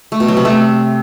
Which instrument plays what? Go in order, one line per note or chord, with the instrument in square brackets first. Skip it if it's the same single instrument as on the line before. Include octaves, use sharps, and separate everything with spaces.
[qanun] A3
B2
F#3
C3
A3